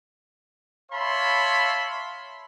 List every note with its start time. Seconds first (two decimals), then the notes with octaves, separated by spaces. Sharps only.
0.92 C#5 E5 F5 A5 B5 C6